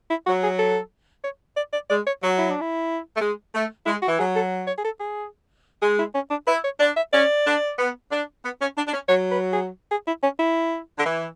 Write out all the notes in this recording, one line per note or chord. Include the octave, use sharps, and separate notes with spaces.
E4
F#3 F#4
G#4
A4
C#5
D5
D5
G#3 D5
C#5
F#3 F#4
E4
D4
E4
A3
G#3
A3
G#3 E4
F#4
E3
F#3 G#4
A4
C#5
G#4
A4
G#4
G#3 G#4
E4
C#4
D4
E4 B4
C#5
D4 D5
E5
C#4 D5
D4
B3
D4
B3
C#4
D4
D4
C#4
F#3 C#5
B4
G#4
G#4
E4
C#4
E4
D3
E3